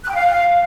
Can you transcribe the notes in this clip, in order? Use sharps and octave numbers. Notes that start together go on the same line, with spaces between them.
F#6
G5
F5